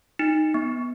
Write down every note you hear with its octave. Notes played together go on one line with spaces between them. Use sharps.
D#4
B3